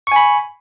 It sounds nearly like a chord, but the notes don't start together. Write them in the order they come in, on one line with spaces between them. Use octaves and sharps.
C#6 G#5 B5